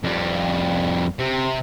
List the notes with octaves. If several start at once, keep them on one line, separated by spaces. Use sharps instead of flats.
F2 G3
C3